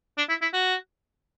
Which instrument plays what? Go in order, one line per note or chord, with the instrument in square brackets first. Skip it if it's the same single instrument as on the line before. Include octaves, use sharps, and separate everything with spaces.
[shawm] D4
E4
E4
F#4